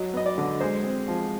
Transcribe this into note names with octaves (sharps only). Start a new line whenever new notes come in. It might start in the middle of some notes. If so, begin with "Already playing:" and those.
Already playing: F#3 D#5
B3 D#5
D5
D3
G#3 C5
C4
F3